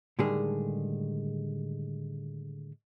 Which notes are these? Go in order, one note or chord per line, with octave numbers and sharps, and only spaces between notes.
A2 D3 D#3 G3 G#3 G#4